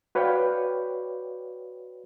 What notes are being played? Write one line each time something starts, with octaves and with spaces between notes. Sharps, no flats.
F#4 B4 C#5 D5 F5 G5